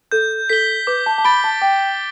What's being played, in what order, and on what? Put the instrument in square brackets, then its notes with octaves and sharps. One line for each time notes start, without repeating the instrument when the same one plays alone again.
[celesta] A4 [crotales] G6
[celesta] A4 [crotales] B6 G7
[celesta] B4 [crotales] D6
[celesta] A5
A5
[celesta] B5 [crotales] A6 D7 G7
[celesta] A5
[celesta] G5 [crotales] D6